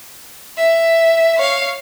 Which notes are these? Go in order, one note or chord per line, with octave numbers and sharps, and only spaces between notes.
E5
C#5 F5